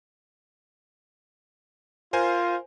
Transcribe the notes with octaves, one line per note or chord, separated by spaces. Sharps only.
F4 A#4 C5 G#5